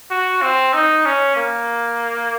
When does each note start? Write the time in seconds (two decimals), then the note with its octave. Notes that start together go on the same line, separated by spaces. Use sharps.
0.11 F#4
0.42 C4
0.74 D#4
1.06 C#4
1.37 A#3